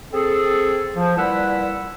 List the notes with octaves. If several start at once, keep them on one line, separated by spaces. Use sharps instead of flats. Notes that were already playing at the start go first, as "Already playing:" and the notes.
C4 G#4 A4
F3
A#2 G3 E4 B4 F#5 E6